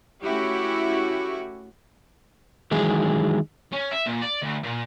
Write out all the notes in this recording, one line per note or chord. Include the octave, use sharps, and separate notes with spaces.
A3 C#4 E4 F#4 G4
D#3 E3 F#3 G#3 G#4
C#4
E5
A#2
D5
D2
A#2